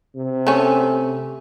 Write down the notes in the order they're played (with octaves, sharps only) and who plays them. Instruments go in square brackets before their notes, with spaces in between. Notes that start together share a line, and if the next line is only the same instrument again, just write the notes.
[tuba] C3
[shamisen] A3 C#4